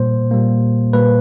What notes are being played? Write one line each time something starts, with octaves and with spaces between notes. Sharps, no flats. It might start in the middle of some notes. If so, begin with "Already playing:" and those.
Already playing: A#2 G3 A#3 C5
A#2 G3 A#3
A#2 G3 A#3 B4